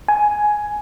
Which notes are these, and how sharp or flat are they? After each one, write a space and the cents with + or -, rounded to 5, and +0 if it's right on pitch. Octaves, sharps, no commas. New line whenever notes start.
G#5 +10